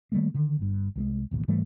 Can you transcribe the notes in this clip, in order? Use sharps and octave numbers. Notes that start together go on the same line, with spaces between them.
D#3 G3 A3 A#3
D3 D#3
G1 G2
C2 F3 G#3
E1 A1 D#2
G#2 E3 G3 A3